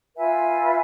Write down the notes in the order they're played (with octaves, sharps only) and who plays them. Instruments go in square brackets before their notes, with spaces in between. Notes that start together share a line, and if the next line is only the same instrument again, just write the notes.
[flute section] F4 B4 E5 G#5